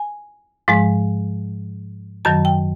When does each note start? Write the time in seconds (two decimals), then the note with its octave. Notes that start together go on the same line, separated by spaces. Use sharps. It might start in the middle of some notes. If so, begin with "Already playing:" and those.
Already playing: G#5
0.68 G#2 F3 G#3
2.25 F#2 D#3 F#3 A5
2.45 G5